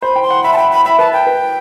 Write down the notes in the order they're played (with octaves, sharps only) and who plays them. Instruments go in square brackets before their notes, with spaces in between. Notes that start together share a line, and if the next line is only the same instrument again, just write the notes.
[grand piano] C5 [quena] B5
[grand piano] G5
[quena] C6
[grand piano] F#5
[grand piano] E5 [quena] B5
[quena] A5
[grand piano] G5 [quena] B5
[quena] B5
[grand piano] E5 [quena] B5
[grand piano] B4 [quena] A5
[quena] G5
[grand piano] B4